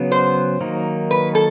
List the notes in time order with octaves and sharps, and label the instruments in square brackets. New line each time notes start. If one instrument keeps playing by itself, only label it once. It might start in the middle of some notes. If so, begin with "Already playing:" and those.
Already playing: [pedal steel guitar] C#3 F#3 B3
[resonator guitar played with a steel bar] C5
[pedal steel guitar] D#3 F#3 A#3 D#4
[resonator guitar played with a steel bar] B4
A4